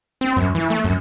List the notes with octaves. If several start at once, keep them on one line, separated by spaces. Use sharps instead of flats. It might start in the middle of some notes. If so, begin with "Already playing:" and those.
C4
F#2
E3
A3
F#2